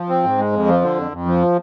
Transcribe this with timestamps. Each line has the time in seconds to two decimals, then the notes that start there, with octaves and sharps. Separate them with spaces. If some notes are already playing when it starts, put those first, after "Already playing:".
Already playing: F3
0.09 C4
0.23 G#2
0.38 G#3
0.52 F2
0.67 F3
0.82 D3
0.96 F2
1.11 F2
1.26 F3